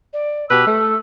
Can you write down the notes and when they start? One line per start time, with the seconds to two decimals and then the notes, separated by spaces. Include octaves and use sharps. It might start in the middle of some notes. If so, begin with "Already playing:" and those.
0.13 D5
0.49 B2 G4 B4 E6
0.65 A3